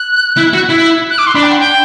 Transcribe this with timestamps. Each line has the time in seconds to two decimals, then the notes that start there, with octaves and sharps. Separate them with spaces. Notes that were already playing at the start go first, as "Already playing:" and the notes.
Already playing: F#6
0.37 E4
0.53 F#4
0.69 E4
1.10 F#6
1.18 D6
1.27 C6
1.35 D4 B5
1.43 G5
1.51 F#5
1.59 G5